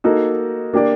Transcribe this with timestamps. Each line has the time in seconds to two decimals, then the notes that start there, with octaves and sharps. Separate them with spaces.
0.04 A#3 D#4 F#4 A4
0.74 A#3 D4 G4 D5